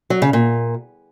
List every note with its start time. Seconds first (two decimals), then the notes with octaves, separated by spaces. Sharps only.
0.10 F#3
0.22 C#3
0.33 A#2